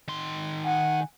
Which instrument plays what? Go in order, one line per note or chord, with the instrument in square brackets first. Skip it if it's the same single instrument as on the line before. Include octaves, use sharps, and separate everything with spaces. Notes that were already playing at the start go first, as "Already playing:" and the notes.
[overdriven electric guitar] D#3 C6
[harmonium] F#5 G#5